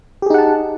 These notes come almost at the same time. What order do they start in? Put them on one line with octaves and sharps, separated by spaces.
G4 G#4 D#4 F#5 A5